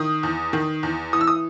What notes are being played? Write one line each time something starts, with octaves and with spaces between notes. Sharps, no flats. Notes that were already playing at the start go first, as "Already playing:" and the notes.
Already playing: D#3 D#6
E2
D#3
E2
E3 D#6
E6
D#6